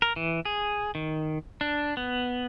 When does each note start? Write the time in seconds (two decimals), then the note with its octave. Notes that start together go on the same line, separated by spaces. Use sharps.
0.02 A#4
0.16 E3
0.45 G#4
0.95 D#3
1.61 D4
1.97 B3